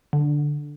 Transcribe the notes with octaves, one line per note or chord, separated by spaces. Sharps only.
D3